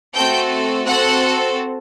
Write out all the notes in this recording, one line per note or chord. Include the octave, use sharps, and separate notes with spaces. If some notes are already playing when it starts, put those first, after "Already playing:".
A3 C4 F#4 A4 G5 G6
C4 F#4 A4 F#5 F#6